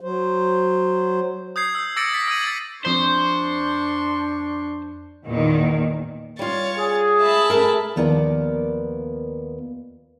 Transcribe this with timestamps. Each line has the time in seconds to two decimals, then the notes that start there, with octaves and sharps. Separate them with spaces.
0.01 F#3 C5
1.56 D#6 G6 G#6 C7
1.75 E6 C7
1.96 D6 E6 A6 A#6 C#7 D7
2.13 A6 B6
2.28 E6 G#6 D7 D#7 F#7
2.46 A6
2.85 F2 D4 C5 C6 C#6 G6
5.26 E2 A#2 D#3
6.39 G3 F4 C#5 A6
6.78 G#4
7.20 E5 A5 B5
7.50 A3 G#4 A#4
7.96 D#2 F3 B3 A#4 D5 A#5